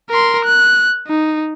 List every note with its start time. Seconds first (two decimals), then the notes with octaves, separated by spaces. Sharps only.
0.10 A#4 C6
0.45 F#6
1.08 D#4